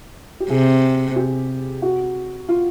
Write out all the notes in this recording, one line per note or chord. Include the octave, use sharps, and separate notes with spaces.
G4
C3 G#4
G4
F#4
F4